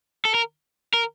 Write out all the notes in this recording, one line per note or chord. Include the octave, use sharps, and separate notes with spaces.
A4
A#4
A#4